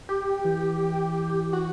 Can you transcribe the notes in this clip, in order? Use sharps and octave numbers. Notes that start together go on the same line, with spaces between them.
G4
E3
F#4